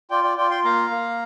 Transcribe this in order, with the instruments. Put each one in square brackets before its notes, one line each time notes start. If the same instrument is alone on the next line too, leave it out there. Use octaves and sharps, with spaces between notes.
[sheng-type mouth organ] F4 D5 G5
D5 G5
F4 D5 G5
G5 C6
A#3 F5 A#5
A#3